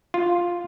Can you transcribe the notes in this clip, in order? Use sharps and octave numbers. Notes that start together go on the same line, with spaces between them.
F4